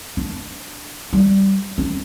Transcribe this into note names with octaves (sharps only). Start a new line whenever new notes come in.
D4
G3
C#4